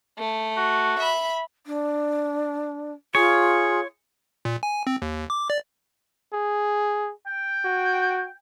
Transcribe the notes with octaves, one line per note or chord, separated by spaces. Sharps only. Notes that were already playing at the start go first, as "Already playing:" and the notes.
A3
F#4
E5 B5
D4
F4 G#4 C#5
A#2
G#5
C4
D#2
D6
D5
G#4
G5
F#4